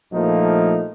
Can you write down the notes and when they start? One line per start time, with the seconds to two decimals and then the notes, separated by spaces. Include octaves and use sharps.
0.13 A#1 F3 A3 A#3 D#4